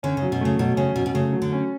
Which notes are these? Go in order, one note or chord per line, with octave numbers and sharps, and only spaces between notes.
D3 C#4
C#3
F#3
B2
C#3 A3
B2 F#3
C#3 C#4
B2 F#3
B2
C#3 A3
F#3
D3
C#4